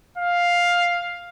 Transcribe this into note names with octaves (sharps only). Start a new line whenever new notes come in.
F5